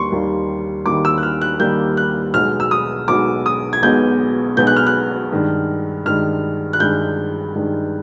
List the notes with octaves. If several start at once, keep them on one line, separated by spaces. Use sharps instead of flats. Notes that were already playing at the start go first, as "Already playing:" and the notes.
Already playing: D#2 G3 A#3 C6 C#6
D#2 D#3 G3 A#3
D#2 D#3 G3 A#3 D6
E6
F#6
F6
F#6
D#2 D#3 G3 A#3 G6
F#6
B1 B2 G#3 B3 F6
E6
D#6
B1 B2 G#3 B3 D6
D#6
G#6
B1 B2 G#3 B3 G6
B1 B2 G#3 B3 G6
F#6
F6
F#6
G2 D#3 G#3
G2 D#3 G#3 F6
F#6
G2 D#3 G#3 G6
G2 D#3 G#3